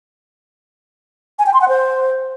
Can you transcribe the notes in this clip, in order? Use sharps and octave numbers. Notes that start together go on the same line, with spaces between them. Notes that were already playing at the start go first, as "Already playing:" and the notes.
G#5
G5
C6
F#5
C5